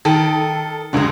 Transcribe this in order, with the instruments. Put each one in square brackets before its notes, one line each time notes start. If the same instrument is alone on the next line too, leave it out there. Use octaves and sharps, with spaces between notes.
[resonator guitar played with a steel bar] D#3 [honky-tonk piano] A4 D7
[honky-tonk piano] C#2 D3 [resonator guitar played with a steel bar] F#3 G#3